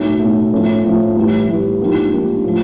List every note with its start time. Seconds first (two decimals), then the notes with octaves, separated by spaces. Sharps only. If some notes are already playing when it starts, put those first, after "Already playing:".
Already playing: B1 A2 F#3 A3
0.20 B1 A2 F#3 A3
0.53 A2 F3 A3 C#4
0.84 A2 F3 A3 C#4
1.16 A2 E3 G3
1.47 A2 E3 G3
1.80 G#2 F3 A#3 D4 G4
2.12 G#2 F3 A#3 D4 G4
2.43 A2 F3 A#3